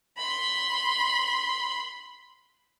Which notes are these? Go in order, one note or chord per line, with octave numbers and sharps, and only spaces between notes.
B5 C6